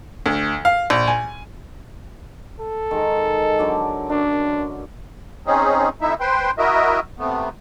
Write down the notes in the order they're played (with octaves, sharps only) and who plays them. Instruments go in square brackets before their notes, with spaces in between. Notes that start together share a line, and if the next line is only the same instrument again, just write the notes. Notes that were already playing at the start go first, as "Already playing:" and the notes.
[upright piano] D2
F5
A#1
G#5
[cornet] A4
[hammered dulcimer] D#3 G#3 A#4
D3 F#3 D4
[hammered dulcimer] F#2 [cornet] D4
[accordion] C4 C#4 D#4 G#4
F2 D#4 E4 E5
B4 C5 G5 C6
E4 F#4 A#4 D#5 E5
C3 A3 B3